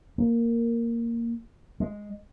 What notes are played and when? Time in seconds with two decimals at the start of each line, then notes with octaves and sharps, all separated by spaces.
0.18 A#3
1.80 G#3